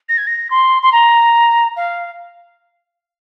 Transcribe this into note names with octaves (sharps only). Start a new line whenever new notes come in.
A#6
G#6
A#6
C6
C6
A#5
F5